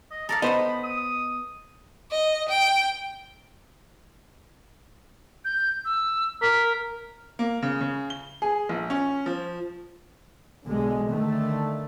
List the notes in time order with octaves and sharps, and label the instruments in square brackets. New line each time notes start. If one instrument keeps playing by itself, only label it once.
[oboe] D#5
[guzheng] A4 D5 F5 [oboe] A#5
[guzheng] B3 D#4 [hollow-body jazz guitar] C5 D#5 [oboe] B5
[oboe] D#6
[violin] D#5
G5
[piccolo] G6
E6
[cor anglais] A#4 [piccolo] B6
[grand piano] A#3
C#3
C#3
G7
G#4
A#1
C#4
F3
[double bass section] B1 D3 G#3
D3 D#3 A3